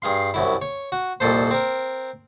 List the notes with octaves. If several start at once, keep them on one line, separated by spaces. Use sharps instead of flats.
G2 G#4 F5 C6
C2 F#2 E4
C#5
F#4
C2 F2 A#2 A4 C5
C4 A#4